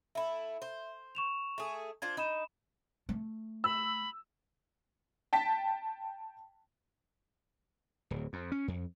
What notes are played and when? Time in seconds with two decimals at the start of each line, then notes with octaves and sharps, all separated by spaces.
0.15 A3 E4 E5
0.62 C5
1.15 C#6 E7 F7
1.58 A3 G#4
2.02 D4 F4 C5 G#6
2.17 D#4 B5 E7
3.09 A3
3.64 B5 E6
5.33 G5 A5 B6
8.10 D1
8.33 F2
8.52 C#4
8.68 F2